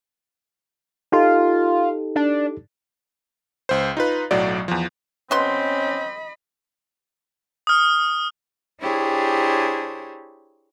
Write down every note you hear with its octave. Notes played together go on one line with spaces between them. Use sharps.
D#4 F4 G4 A4
D4
C#2 C5
D#4 F4 B4
B1 A2 F#3 D5
E2 F3
B2 C4 C#4 D#5 B5 C6
D#6 F6
D4 E4 G4 G#4 C5 C#5